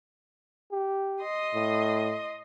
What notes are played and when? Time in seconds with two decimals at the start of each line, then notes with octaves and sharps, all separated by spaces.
0.72 G4
1.21 D#5 C6 D#6
1.55 A2